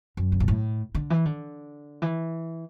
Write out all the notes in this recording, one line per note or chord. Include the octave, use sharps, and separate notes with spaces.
F#2
C#3
B2
A2
D3
E3
D3
E3